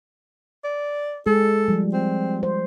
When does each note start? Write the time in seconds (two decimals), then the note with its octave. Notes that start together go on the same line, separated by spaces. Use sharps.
0.64 D5
1.26 G#3 G#4 A4
1.68 F3 G3
1.93 C4
2.43 C5